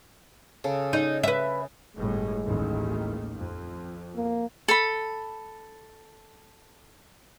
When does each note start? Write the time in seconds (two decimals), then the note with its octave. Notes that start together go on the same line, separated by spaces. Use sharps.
0.64 C#3 A4
0.93 D#4
1.23 B4 E5
1.96 G1 A2 G#3
2.44 A1 D#2 D#3
3.35 F2
4.16 A#3
4.68 A4 B5